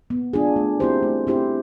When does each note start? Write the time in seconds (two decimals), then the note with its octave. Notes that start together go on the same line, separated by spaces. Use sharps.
0.10 B3
0.33 D4 F4 G#4
0.56 A3
0.80 C4 E4 G4 C5
1.03 A3
1.27 C4 E4 G4 C5